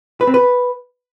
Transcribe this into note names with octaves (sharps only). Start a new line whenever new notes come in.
B4
C4
B4